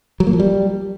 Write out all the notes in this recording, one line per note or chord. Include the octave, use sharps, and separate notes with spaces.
F#3
A#3
F3
G3